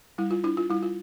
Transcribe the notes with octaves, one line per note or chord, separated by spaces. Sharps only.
G3 E4
F4
D4 E4
F4
G3 E4
F4